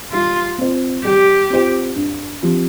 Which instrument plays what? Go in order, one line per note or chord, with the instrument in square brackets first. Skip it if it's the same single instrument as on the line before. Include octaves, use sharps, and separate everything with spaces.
[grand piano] G3 [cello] F4
[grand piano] C4 F4 C5
[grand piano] G3 [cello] G4
[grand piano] C4 F4 C5
G2
F3 C4 G4